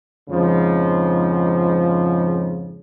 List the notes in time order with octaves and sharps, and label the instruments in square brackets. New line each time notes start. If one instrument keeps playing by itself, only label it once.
[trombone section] F2 G#2 C#3 F3